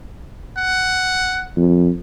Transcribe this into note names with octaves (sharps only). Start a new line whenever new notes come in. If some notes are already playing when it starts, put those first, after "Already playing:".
F#5
F2